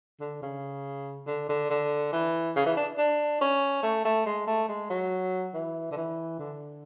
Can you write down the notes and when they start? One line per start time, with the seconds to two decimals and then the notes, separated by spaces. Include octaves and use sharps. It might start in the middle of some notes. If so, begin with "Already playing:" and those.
0.21 D3
0.42 C#3
1.27 D3
1.49 D3
1.70 D3
2.12 E3
2.56 C#3
2.66 E3
2.77 D4
2.98 D4
3.41 C#4
3.83 A3
4.05 A3
4.26 G#3
4.47 A3
4.68 G#3
4.90 F#3
5.54 E3
5.91 D3
5.96 E3
6.39 D3